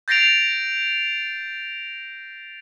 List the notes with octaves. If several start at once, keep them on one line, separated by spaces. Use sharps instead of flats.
G6 A6 A#6 C7 D7 F7